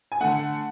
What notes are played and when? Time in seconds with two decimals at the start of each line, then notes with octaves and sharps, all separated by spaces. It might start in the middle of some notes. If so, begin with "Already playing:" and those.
0.12 G#5
0.21 D3 A3 F#5